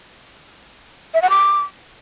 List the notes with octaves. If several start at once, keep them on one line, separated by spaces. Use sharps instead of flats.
E5
F#5
D6